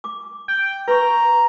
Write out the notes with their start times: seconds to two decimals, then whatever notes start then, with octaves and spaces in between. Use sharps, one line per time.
0.04 D6
0.48 G5
0.88 B4 A#5 C6 C#6